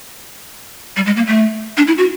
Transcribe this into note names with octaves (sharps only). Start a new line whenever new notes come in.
G3
G#3
A#3
A3
D4
E4
F#4